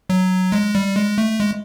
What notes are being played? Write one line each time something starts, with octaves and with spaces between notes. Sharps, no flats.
F#3
G#3
G3
G#3
A3
G#3